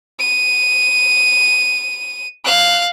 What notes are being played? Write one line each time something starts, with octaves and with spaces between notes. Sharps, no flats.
D#7
F5 F#6